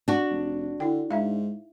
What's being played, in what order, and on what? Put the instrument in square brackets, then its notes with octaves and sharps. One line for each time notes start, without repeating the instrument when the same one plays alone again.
[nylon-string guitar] D4 F#4
[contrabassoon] F1
[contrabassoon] D3 [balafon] E4 G5
[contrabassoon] G#2 [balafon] D#4 E5 F5